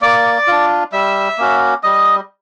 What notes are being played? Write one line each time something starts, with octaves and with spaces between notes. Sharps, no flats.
A#3 D5 D6
D4 F4
G3 E5 E6
A#3 C#4 F#4
G3 D#5 D#6